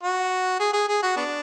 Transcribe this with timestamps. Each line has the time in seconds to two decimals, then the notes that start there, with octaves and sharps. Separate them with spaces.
0.03 F#4
0.60 G#4
0.73 G#4
0.88 G#4
1.02 F#4
1.17 B3 D4